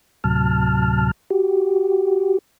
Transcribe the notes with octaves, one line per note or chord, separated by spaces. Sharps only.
D2 A2 C3 F#3 A5 F6
F#4 G4